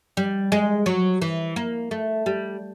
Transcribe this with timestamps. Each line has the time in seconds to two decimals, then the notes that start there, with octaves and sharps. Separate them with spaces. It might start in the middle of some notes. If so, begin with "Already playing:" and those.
0.17 G3
0.52 G#3
0.86 F#3
1.22 E3
1.56 A#3
1.91 A3
2.26 G3